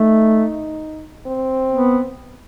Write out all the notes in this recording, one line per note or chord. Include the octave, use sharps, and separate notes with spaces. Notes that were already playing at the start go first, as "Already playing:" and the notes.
Already playing: A3 D#4
C4
B3